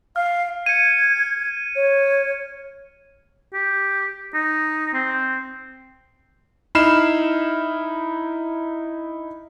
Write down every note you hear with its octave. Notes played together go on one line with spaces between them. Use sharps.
F5 F6
G#6 C#7 D#7
C#5
G4
D#4
C4
D#4 E4 B5 F6 C7 E7